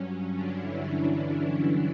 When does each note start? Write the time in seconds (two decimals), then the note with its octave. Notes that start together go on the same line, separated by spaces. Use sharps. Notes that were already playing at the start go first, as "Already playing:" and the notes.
Already playing: G2 F#3 C#4
0.34 D3 D4
0.62 E3 E4